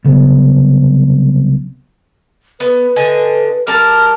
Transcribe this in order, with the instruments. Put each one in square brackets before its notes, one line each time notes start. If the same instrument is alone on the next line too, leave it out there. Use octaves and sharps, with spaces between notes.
[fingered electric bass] C2 C#3 F#3 B3
[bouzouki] B3 [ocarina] B4
[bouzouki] D3 D#5 G#5
[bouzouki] G3 A#4 A5 [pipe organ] F6